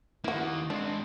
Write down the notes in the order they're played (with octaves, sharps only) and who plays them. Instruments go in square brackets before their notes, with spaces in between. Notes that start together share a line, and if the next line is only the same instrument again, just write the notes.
[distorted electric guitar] D#3 A#3 [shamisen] E4 F#4
[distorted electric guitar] G#2 C4 [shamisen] D4